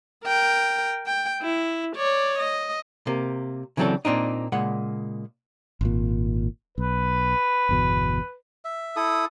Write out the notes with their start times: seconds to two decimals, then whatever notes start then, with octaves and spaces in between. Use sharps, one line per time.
0.25 A#4 G5
1.06 G5
1.42 E4
1.96 C#5 D5
2.39 D#5
3.07 C3 A#3
3.77 C#3 E3 F#3 C4 D4 A4
4.05 A#2 C4 D4 D#4
4.52 A#2 C#3 G#3 F#5
5.81 G#1 A#2
6.78 B1 B4
7.69 G1 E2 B2
8.65 E5
8.96 E4 A4 D#6